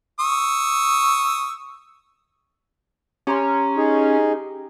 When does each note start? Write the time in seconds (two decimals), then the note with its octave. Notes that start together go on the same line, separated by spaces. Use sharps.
0.20 C#6 D#6 E6
3.27 C#4 G4 A#5 C6
3.77 D#4 G#4